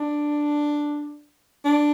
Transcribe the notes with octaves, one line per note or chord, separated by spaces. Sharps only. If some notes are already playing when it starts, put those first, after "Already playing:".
Already playing: D4
D4